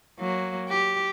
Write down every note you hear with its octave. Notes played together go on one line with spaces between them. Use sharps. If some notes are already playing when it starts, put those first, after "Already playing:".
F#3 A#3
G4